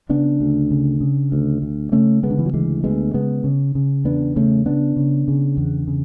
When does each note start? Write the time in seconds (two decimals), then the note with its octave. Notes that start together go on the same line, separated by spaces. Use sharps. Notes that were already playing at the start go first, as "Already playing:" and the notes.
0.09 C#3 B3 D4
0.40 D2
0.71 C#3
1.01 C#3
1.32 D2
1.62 D2
1.92 C#3 A3 C#4
2.23 C#3 G#3 B3
2.30 D3
2.39 E3
2.46 F#3
2.53 D2 E3 G#3
2.83 D2 G#3 B3
3.14 C#3 G#3 B3
3.44 C#3
3.75 C#3
4.05 E2 B3 D4
4.36 C#3 A3 C#4
4.66 C#3 B3 D4
4.97 C#3
5.28 C#3
5.57 E2
5.88 C#3